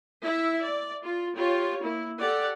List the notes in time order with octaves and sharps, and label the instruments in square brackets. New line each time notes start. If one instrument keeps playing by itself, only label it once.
[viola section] E4 E5
D5
F4
F4 G4 C#5
A#3 E4
G4 A4 D5 F#5